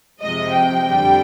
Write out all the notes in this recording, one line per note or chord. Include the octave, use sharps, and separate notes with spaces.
F2 C3 F3 G#3 D#5
G5
F2 D3 G3